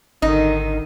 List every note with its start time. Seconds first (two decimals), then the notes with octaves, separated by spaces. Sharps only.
0.22 G#1 D3 D#3 D#4